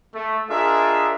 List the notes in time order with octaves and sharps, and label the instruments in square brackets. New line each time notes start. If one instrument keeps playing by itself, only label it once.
[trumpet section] A3
D4 F4 G#4 A#4 D#5 E5